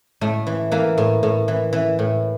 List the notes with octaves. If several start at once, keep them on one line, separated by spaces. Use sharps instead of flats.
A2 A3
E3
E3 A#3
A2
A2
E3
E3
A2